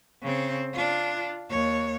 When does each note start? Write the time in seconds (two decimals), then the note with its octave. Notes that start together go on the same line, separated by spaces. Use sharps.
0.22 C#3 C4
0.73 D4 F4
1.49 D#2 C#5